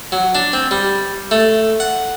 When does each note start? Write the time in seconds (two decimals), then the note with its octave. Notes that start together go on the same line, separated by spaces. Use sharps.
0.12 F#3
0.35 D4
0.53 C4
0.71 G3
1.31 A3
1.80 F#5